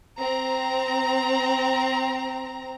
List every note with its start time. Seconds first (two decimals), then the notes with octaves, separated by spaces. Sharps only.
0.20 C4 A#5